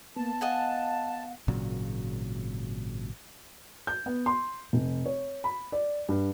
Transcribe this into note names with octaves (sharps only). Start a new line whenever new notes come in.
A#3 B3 A5
D#5 F5 F#5 G#5
G#1 A#2 C#3 F#3
G6
B3
C6
F1
C#5
B5
D5
G2